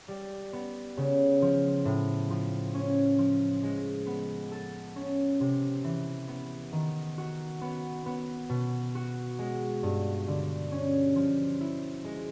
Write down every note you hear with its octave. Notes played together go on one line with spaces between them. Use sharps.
G3
B3
C#3
F3
A2
F3
C#4
F3
G#3
B3
A4
C#4
C3
E3
B3
D#3
F#4
B3
B3
B2
F#4
G#3
G2
D3
C#4
F3
E4
G#3